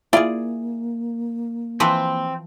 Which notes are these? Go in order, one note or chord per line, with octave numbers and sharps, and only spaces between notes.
A#3 E4 F4 G#4 D5
E3 F3 C4 B4